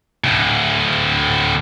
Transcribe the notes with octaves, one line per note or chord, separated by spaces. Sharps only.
D2 A2